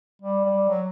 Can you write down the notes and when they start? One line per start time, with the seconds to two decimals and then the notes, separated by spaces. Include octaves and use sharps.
0.22 G3
0.45 G3
0.69 F#3